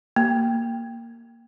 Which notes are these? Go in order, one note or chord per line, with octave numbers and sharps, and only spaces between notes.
A#3